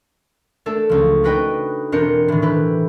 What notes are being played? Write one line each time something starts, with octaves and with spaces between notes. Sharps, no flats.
A3 D4 A4
C#2 F3
D4 D#4 F#4 B4 D#5 G5
E1 C4 D4 A#4 G6 C#7
A2 D#3
E3 G4 B4